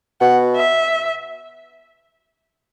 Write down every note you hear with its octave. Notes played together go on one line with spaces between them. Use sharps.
B2 F#5
E5